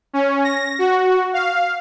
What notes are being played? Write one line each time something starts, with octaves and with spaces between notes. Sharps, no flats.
C#4
A#6
F#4
F5